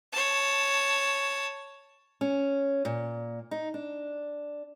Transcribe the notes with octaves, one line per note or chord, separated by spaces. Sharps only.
C#5 A5
C#4
A#2
D#4
D4